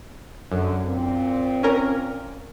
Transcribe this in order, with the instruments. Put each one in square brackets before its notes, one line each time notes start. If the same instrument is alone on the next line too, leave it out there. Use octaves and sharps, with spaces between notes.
[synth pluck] F#2 [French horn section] D3
[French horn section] A#2 C4
[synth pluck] C#4 A#4